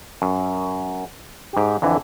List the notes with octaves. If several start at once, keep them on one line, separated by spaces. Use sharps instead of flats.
F#2
G#2 G4
F2 D3 E3